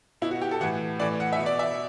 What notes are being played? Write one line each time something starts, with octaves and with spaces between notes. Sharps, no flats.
B2 E4
F#4
G4
A4
A2 E3 F#5
A2 E3 D5
F#5
E5
B2
D5
E5